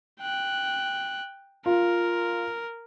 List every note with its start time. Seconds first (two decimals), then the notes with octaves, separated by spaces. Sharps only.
0.21 G5 F#6
1.66 F4 A#4